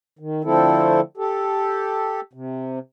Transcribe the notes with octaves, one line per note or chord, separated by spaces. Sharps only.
D#3
D3 F3 A3 C4 E4 A4
G4 A4
C3